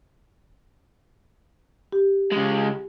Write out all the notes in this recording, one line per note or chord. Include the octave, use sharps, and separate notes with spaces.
G4
C#3 G#3